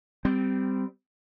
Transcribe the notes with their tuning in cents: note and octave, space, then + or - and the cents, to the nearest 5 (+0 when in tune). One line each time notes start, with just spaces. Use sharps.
G3 +0 C4 -20